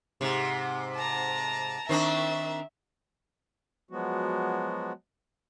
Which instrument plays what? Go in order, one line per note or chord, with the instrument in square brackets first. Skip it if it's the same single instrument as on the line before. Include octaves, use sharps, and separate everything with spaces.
[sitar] G#2 C3
[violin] A5 A#5
[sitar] D#3 C4 D4 [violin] E5
[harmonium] F3 F#3 G#3 B3 F#4